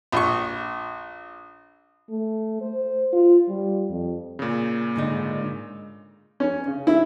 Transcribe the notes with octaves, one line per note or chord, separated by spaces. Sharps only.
A#1 C#6
A3
C5
F4
G3
F2
A#2 C#3
G#2 D3 D#4
C#4
C#3
E4